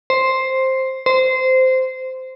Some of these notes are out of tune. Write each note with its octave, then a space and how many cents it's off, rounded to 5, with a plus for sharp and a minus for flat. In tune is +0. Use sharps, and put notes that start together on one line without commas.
C5 +5
C5 -15